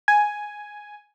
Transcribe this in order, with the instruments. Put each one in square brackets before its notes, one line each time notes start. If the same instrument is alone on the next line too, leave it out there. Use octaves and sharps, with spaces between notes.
[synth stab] G#5